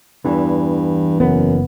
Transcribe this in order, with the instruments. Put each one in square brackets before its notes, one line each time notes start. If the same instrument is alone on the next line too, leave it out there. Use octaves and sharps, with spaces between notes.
[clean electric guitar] E2 E3 [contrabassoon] G2
[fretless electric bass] F#1 B3 [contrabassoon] F#2